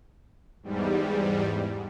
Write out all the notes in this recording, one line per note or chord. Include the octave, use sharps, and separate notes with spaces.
E2 G#2 G3